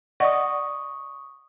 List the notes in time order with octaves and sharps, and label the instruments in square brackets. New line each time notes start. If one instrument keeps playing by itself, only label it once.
[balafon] D5 D#5 F#5 [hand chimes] C#6 D#6